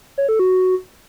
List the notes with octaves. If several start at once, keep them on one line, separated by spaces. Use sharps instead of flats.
C#5
A4
F#4